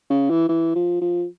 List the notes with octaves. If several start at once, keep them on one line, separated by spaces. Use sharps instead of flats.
C#3
E3
E3
F3
F3